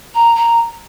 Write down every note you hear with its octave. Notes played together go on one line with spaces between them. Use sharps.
A#5
A#5